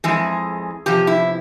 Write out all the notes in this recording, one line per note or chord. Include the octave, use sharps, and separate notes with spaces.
F2 E3 G#3 G#4
E2 C3 F3 G4
E4